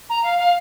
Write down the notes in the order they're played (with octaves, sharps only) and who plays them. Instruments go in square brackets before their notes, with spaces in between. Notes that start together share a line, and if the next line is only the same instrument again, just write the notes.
[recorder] A#5
F5
F5